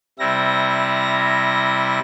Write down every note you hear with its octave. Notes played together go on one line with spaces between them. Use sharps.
C3 G3 E4 A#6